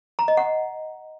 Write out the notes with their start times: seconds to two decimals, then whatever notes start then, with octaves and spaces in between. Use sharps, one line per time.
0.19 A#5
0.28 D#5
0.37 F#5